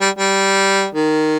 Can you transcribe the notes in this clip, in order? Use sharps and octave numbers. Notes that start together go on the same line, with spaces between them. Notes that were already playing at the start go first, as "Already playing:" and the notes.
G3
G3
D#3